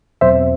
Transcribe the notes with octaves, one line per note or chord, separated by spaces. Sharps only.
E2 B2 F#3 C4 C5 E5